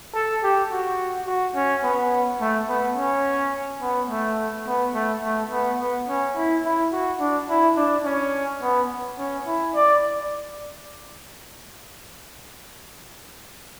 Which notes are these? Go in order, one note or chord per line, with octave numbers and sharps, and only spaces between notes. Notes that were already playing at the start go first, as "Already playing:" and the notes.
A4
G4
F#4
F#4
C#4
B3
A3
B3
C#4
B3
A3
B3
A3
A3
B3
B3
C#4
E4
E4
F#4
D4
E4
D4
C#4
B3
C#4
E4
D5